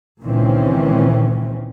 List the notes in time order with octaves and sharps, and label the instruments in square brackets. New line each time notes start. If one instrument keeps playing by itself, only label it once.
[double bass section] C#2 A#2 D#3 E3 C4 C#4